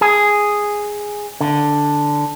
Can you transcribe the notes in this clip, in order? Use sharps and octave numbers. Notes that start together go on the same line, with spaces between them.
G#4
D3